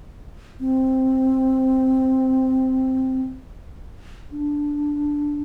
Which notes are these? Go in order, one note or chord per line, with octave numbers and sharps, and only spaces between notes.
C4
D4